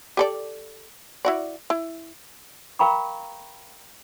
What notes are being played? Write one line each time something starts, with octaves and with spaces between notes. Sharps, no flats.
G4 A4 D5
E4 F#4 D5
E4
A#4 F5 G5 A#5 B5 C#6